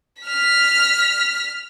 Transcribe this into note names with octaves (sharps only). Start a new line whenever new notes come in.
F6 B6